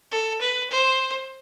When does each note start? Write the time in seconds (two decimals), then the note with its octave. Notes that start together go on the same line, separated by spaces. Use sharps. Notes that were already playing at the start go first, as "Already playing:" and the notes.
0.11 A4
0.41 B4
0.70 C5